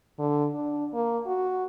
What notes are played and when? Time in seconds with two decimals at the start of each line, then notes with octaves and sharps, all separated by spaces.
0.19 D3
0.54 D4
0.93 A#3
1.27 F#4